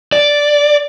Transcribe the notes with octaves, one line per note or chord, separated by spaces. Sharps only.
D5